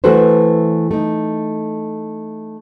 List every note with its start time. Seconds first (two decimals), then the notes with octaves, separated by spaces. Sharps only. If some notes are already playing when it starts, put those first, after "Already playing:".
0.04 E3 A3 F#4 A4 B4 C5
0.91 A3 D#4